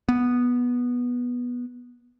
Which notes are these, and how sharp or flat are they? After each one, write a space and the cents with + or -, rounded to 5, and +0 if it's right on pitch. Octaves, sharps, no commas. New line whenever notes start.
B3 -10